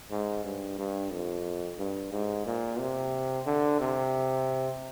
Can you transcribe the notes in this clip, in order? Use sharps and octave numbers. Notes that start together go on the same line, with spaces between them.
G#2
G2
G2
F2
G2
G#2
A#2
C3
D3
C3